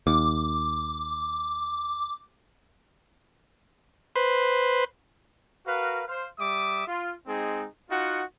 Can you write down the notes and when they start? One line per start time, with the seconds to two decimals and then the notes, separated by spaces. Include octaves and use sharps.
0.07 D#2 D6
4.16 B4 C5
5.66 F#4 A#4 B4 F5
6.08 C5 F5
6.38 G3 E5 D6 D#6
6.87 F4
7.27 G#3 C4 D#4 G#4
7.90 D#4 F4 F#4 F#5